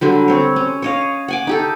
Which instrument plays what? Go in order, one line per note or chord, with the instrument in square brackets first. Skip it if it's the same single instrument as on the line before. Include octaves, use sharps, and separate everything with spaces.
[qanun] D3 F#3 G3
C4 C#5
C#4
C#5 D#5 F5
F#5 G#5 D6
D#4 G4 A4